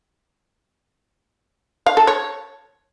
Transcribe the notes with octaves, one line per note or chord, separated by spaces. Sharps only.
F5
A4
C#5